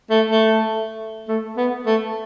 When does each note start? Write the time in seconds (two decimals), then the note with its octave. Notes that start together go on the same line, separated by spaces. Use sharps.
0.10 A3
0.31 A3
1.28 A3
1.57 B3
1.86 A3